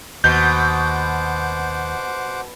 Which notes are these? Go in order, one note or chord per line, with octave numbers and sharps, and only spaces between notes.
D#2 B2 C5 F#5 D6 G6